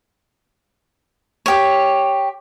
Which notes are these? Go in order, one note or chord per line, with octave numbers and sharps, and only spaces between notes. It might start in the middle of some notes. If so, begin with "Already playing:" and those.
G4 C#5